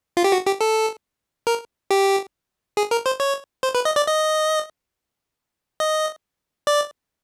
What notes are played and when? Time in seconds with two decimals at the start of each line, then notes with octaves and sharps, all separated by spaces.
0.17 F4
0.24 G4
0.32 F#4
0.46 G4
0.61 A4
1.47 A#4
1.91 G4
2.77 G#4
2.91 A#4
3.06 C5
3.20 C#5
3.63 C5
3.75 B4
3.85 D#5
3.96 D5
4.07 D#5
5.80 D#5
6.67 D5